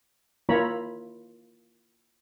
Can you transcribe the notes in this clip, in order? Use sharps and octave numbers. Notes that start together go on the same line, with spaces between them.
A#3 E4 F4 C#5 A#5 B5